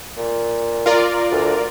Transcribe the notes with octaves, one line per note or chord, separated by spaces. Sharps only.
A#2
F4 A#4 D5
D2